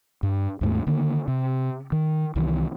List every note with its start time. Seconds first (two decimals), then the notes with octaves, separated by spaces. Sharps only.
0.23 G2
0.61 D#2 G#2 A3
0.87 D3 D#3 A#3
1.28 C3
1.92 D#3
2.36 C2 D#3 E3